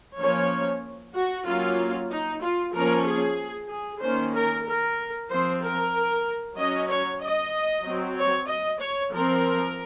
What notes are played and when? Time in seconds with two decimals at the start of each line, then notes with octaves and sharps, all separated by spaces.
0.19 F3 A#3 C#4 C#5
1.14 F#4
1.46 F#3 A#3 C#4 F4
2.10 D#4
2.42 F4
2.74 F3 A#3 C#4 A#4
3.06 G#4
3.70 G#4
4.01 D#3 A#3 C#4 C5
4.34 A#4
4.66 A#4
5.30 F3 C4 C5
5.61 A#4
6.56 F#3 C#4 D#5
6.89 C#5
7.20 D#5
7.84 F#3 C4
8.17 C#5
8.47 D#5
8.80 C#5
9.12 F3 C4 A#4